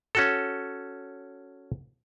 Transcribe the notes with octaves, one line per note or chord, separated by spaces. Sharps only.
C#4 F#4 A4